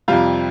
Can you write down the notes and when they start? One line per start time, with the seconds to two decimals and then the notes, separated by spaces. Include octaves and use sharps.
0.08 F2 C3 G3 F4